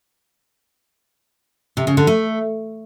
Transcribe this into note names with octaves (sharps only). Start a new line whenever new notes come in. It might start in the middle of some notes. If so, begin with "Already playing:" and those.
C3
C#3
D3
A3